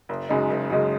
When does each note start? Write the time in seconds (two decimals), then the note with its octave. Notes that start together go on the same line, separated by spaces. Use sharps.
0.09 F#1
0.29 F#2 C#3 G#3 D#4
0.50 F#1
0.70 F#2 C#3 G#3 D#4